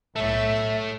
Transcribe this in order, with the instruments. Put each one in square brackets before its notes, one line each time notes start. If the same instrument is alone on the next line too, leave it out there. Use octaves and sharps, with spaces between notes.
[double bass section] B1 A2 [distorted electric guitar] A3 [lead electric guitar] A4 C#5 [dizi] E5